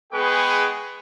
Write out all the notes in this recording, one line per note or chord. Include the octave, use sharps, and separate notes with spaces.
G#3 B3 G#4 B4 G5 C#6